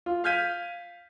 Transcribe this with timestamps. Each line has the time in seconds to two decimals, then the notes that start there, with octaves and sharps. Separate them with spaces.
0.06 F4
0.24 F5 F6 G6 G#6 B6 D#7